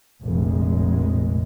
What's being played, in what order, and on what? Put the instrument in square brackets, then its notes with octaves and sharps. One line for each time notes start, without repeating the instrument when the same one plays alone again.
[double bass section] F1 A#1 F2 G#3